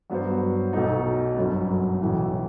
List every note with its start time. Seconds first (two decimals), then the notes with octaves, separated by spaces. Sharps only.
0.10 G2 F#3 B3 F#4 C5
0.73 B1 B2 A3 D#4
1.37 G1 F#2 F#3
2.01 B1 A2 E3